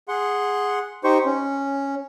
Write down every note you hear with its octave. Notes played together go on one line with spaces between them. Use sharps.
G#4 F#5 C6
D#4 G4 C5 C#6
C#4